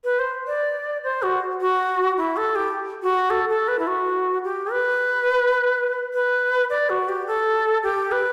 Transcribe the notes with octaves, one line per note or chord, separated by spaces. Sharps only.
B4
C5
D5
C5
F#4
F#4
E4
A4
G4
F#4
A4
A4
B4
E4
F#4
G4
B4
B4
D5
F#4
G4
A4
G4
B4